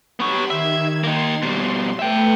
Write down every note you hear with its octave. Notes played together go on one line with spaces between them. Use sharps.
B3 G4 C#5 B5 C6
D#3 E5 G#6
A#3 D#4 C6
B2 G3
A3 B4 E5 G5